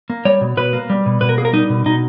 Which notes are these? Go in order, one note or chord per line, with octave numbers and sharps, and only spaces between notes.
A#3
G3 C#5
B2
B2 B4
A#3
G3
B2
B2 B4
A#4
A#3 G#4
A#4
G3 D#4
B2
B2 D#4